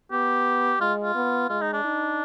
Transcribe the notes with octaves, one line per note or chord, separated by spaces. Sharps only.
B3 G4
G#3 F4
F4
B3
G#3 F4
D#4
D4
D#4